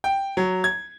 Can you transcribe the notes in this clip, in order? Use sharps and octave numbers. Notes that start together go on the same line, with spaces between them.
G5
F#3
G#6